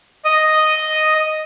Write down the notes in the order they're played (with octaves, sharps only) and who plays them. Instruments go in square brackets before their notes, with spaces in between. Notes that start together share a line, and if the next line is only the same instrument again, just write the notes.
[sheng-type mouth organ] D#5 D#6